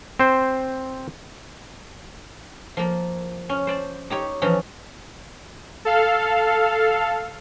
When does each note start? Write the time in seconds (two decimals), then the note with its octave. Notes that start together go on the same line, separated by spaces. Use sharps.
0.20 C4 C5
2.77 F3 A#3
3.49 C#4
3.67 C5 D5 A5
4.10 D#4 G4 C#5
4.42 E3 F3 C#4 D#4
5.85 A4 F5